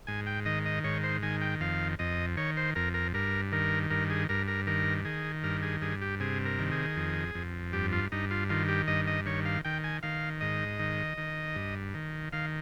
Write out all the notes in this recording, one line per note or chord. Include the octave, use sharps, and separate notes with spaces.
G#2 G#5
G5
D#3 D#5
D#5
G#2 C#5
C5
D#3 G#5
G5
F2 F5
F2 D#5
D#3 C#5
C5
F2 A#4
A#4
G2 A#4
D#3 A#4
G2 A#4
G#4
G2 A#4
A#4
D#3 A#4
D#3 G#4
G2 A#4
G#4
G2 G#4
G4
C3 G#4
A#4
D#3
G#4
F2
F2
G2 G4
F4
G2 D#4
F4
D#3 F4
G4
G2 D#5
D#5
D#3 C#5
F5
D#3 G5
G#5
D#3 F5
G#2 D#5
D#3
D#3
G2
D#3
D#3 F5